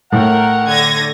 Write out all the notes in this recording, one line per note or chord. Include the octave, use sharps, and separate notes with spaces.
A2 A#4 F#5
D3 G#6 A#6